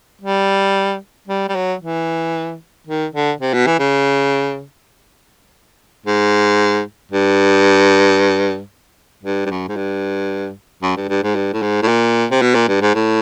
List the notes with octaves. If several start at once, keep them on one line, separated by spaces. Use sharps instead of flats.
G3
G3
G3
F#3
E3
D#3
D3
C3
B2
E3
C#3
G#2
G2
G2
G2
F#2
G#2
G2
F#2
G2
G2
G#2
G2
A2
G#2
A2
A#2
C3
B2
A#2
G2
G#2
A2